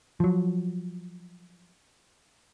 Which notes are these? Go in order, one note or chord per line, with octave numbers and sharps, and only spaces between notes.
F3 F#3